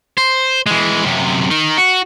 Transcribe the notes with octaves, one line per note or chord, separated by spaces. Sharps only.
C5
E3 G#3
F#2 C3
D#3 D#4
F#4